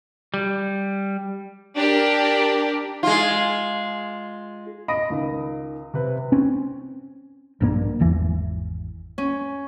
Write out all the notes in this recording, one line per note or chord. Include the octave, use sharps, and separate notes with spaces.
G3
D4 G4 A#4
G#3 F4
D#5 B5 D#6 A#6 D7
C#2 D#3
C3 B4
C4 C#4
A#1 G2 A#3
G#1 E2 E3
C#4